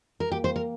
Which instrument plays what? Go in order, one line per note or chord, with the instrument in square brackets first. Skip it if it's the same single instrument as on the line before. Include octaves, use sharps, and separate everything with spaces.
[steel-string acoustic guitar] A#4
[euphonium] A#3 [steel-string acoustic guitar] G4
[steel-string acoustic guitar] C5
A#4